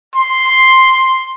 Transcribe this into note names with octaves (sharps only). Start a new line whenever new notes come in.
C6